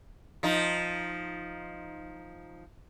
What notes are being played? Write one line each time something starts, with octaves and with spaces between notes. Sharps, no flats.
F3 D#4